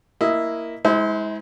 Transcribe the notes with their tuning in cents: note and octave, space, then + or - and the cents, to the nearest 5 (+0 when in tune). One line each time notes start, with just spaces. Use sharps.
A#3 +0 E4 +0 D#5 +15
G#3 +10 E4 -40 C5 -25